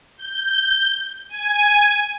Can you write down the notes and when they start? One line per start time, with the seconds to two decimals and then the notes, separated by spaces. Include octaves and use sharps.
0.16 G6
1.28 G#5